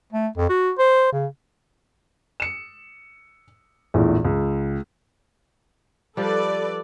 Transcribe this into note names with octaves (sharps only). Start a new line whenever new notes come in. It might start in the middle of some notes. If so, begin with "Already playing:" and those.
A3
F2
F#4
C5
C#3
C#7 E7
A#1 E2 A2
C#2
F3 G3 A4 B4 D5